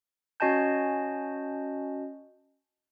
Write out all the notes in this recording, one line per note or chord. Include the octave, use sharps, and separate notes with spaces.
C#4 F#4 D#5 G#5 A5 G6